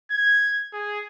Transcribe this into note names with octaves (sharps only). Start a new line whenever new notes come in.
G#6
G#4